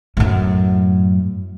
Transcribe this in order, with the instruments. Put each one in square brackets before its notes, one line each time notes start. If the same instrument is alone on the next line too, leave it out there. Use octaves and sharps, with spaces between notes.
[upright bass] F#2 A2